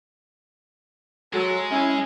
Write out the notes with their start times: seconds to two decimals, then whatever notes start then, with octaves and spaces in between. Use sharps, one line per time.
1.33 F#3 G#3 A4
1.71 C#4 E4